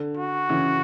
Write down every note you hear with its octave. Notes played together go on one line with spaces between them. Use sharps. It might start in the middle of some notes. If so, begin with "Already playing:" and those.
Already playing: D3
F#4
C#3 E3